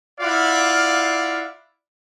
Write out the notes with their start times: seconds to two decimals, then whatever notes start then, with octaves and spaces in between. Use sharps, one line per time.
0.21 E4 F4 D5 F5 F#5